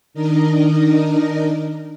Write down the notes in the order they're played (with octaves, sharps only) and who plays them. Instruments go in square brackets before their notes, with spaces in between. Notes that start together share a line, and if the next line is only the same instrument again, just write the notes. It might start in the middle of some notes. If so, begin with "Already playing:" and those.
[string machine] D#3 D4 D#4 A#4 D#5